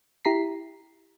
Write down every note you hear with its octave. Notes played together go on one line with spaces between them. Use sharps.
E4 G4 A#5 B6 C7